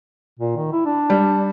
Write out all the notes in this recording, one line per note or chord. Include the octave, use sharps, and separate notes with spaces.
A#2
D#3
E4
D4
G3